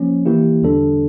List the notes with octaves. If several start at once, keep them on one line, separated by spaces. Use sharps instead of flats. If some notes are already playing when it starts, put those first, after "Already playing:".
Already playing: F3 A#3 C#4
E3 A#3 E4 G4
E2 D3 G3 D4 A4